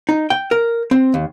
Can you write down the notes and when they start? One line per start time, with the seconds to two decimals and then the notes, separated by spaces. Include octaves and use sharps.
0.09 D#4
0.30 G5
0.51 A#4
0.91 C4
1.14 D#2